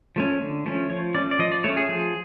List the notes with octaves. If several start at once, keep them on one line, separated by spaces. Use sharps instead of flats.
F3 A3 C#4
D3
F3 A3 C#4
F3 C#5
A3 C#4 D5
D5
F3 D#5
D5
A3 C#4 C#5
G#4
F3 G#4